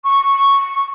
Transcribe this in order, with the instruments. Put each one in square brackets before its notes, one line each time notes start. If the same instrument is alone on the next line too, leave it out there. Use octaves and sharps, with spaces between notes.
[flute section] C#6